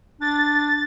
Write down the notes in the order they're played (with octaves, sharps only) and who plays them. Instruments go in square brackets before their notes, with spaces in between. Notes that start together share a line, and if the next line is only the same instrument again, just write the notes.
[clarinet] D4 [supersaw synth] A6